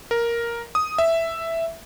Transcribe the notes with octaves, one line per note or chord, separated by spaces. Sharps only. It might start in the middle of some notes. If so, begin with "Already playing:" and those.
A#4
D#6
E5